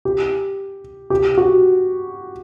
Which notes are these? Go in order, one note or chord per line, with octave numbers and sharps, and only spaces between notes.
G4
G4
F#4